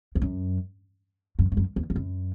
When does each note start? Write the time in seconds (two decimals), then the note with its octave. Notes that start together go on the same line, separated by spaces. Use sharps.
0.15 E2
0.22 F#2
1.39 F#2
1.52 G#2
1.57 F#2
1.76 E2
1.90 E2
1.96 F#2